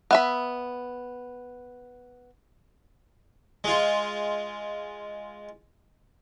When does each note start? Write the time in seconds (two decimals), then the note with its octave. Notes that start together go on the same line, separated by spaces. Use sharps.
0.11 B3 E5 B5
3.64 G#3 F4